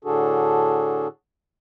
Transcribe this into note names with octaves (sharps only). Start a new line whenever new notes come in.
A2 D3 D4 F#4 G#4 A4